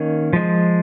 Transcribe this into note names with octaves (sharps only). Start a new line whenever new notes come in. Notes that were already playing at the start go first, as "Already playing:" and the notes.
Already playing: D#3 A#3 C#4
F3 G#3